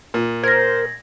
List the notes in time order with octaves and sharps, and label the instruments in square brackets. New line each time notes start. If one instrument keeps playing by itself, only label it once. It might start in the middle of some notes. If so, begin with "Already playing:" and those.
[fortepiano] A#2
[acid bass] A#4 [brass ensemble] C5 [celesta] G#6 A#6